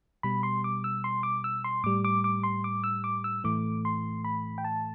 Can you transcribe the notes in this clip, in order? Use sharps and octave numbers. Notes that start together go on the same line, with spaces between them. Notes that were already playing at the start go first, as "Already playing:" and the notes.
B2 G3 B5
C6
D6
E6
C6
D6
E6
C6
A2 G3 D6
D6
D6
C6
D6
E6
D6
E6
A2 E3 A3 D6
C6
B5
G5
A5